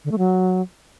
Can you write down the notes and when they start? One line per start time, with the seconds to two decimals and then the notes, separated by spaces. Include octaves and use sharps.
0.05 D3
0.11 A3
0.18 F#3